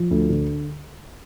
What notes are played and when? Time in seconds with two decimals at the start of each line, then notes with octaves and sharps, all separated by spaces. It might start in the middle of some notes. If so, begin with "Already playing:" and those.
Already playing: F3
0.11 D2
0.29 D3